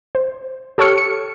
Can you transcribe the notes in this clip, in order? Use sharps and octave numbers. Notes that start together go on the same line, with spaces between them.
C5
G4 A4 C#5 C#6 F6 C#7
C#7